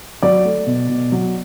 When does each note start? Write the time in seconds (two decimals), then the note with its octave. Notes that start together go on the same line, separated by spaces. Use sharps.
0.22 F#3 D5
0.45 A3
0.67 B2
0.89 B2
1.12 F#3